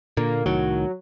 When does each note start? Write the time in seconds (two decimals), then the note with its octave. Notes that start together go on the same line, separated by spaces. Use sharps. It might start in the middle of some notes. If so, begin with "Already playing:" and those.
0.17 A#2 D3 A#3
0.46 C2 A2 D#3 F#3